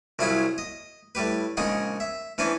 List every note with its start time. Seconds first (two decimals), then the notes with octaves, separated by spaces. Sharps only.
0.19 C2 F#3 E4 F4 G#4 B5
0.58 D#5
1.15 A2 G3 G4 B4
1.57 A#1 C#3 G#3 D#4 G#4 F#5
2.00 E5
2.38 E3 C#4 D4 B4 C5